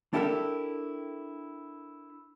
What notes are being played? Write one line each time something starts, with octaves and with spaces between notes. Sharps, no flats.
D4 E4 G4 A4 A#4 E5